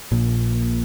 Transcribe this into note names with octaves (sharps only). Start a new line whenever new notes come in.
A#1 A#2